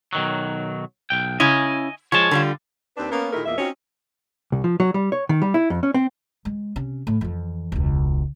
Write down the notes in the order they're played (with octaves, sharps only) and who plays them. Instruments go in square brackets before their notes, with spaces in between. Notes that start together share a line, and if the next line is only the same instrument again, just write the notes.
[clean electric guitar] B1 D#3 F#3
B1 G5
[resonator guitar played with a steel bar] C#3 C#4 E4 [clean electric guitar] D#5 G#5
[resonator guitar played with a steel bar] F3 G#3 [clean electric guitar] C#5 A5
[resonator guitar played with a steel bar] D3 G3 F4
[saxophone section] D#2 C4 D4 B4
A#3 B3 C#4
A#2 D#3 G#3 A3 E4 A#4
E2 A#2 A#3 D#5 E5
C4 C#4 D#4 F4 F#4 C#5
[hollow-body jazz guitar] C2
F3
F#3
G3
C#5
D#3
G3
E4
F2
C#4
C4
[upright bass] G#3
C3 C#4
A2
F2 E3
E1 C#2